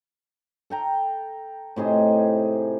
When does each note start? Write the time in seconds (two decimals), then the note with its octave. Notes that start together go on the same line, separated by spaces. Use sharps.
0.70 A4 G5 A#5
1.76 A2 C3 D#4 G#4